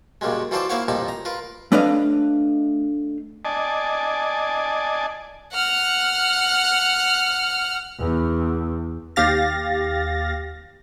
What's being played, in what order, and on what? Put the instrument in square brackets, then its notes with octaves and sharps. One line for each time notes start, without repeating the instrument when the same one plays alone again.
[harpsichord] F#2 A#2 C#3 G3 G#3
E3 F#3 F4 A4 C5 D5
A#3 E4 C5 C#5 F5 F#5
A1 F2 A#2 G3 D#4 A5
A#5
F4 A#4 B4
[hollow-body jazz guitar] A3 D4 B4 C#5 D#5 F5
[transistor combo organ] D5 D#5 G#5 A5
[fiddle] F#5 F6
[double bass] E2
[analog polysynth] D#2 G4 F5 A6 A#6